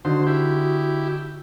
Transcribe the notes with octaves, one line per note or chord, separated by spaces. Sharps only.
D3 D#4 F#4 C5
E4 G4